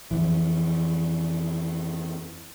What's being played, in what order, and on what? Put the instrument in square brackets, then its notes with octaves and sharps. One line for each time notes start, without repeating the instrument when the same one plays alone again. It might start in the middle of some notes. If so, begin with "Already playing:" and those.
[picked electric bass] F2 E3